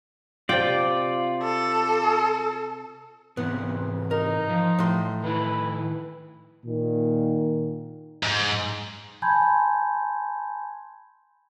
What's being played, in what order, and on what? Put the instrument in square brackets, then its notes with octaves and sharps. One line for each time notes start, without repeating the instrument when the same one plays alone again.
[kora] C3 G5 [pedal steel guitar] F4 D5
[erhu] A4
[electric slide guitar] G#2 C3 E3 [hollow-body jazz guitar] B3
[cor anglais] D#4 [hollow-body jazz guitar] A#4
[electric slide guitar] F3
[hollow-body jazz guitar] A2 C6
[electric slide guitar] D#3 E4 [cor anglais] B4
[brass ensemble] A#2 D#3
[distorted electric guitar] G#2
[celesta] G#5 A5 B5 C6 G6 G#6